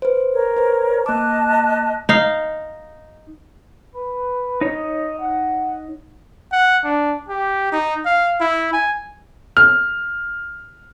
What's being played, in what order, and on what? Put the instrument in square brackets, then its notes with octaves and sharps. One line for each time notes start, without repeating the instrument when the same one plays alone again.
[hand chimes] B4 C5
[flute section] A#4 C#5
[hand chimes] B4 C5
[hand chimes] A#3 D6 [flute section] D#5 A5 F#6
[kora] D#4 F5
[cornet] B4
[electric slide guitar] D#4 C#5 [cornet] D#5
[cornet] F#5
F#5
D4
G4
D#4
F5
E4
G#5
[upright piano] F6